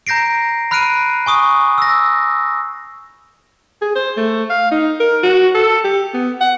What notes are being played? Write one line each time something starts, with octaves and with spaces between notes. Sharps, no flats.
A#5 G6 A#6 C7 D7
B5 F6 F#6 C7 D7 D#7
G#5 C#6 D#6
E6 A#6
G#4
C5
A3
F5
D#4
A#4
F#4
A4
G4
B3
F#5